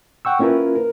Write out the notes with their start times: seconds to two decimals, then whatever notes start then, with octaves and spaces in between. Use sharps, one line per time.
0.25 F#5 G5 C#6 E6
0.39 A#3 C#4 E4 F4 A#4 B4
0.75 A#4